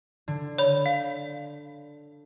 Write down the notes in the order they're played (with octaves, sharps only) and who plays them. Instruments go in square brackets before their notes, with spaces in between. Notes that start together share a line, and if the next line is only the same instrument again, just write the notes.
[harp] D3
[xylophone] C#5 B5
F5